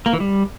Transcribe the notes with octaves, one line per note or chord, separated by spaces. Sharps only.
A#3
E3
G3